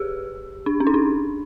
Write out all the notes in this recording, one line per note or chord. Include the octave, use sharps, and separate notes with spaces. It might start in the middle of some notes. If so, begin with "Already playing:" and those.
Already playing: G4 G#4 B4
D4
C#4
D#4
D4